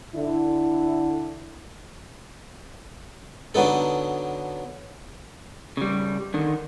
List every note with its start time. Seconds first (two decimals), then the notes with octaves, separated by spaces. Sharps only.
0.15 D3 E4
3.54 D3 F#3 B3 D#4 A4
5.77 C#3 G3
6.34 D3 D#3